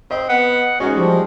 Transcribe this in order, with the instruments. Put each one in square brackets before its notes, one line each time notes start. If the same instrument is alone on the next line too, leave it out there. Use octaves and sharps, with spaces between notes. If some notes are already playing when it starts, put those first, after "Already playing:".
[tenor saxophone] C4 [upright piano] D#5
[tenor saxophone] B3 [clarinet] F#5
[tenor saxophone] G#3 [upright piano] C#4 D#4 [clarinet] F#4
[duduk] F3 [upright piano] G3